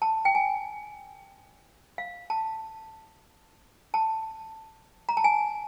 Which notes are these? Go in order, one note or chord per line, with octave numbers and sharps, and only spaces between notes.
A5
G5
G#5
F5
A5
A5
A#5
A5
G#5